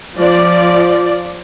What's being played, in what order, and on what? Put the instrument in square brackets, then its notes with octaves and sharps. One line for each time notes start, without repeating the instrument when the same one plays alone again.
[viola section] F3 D5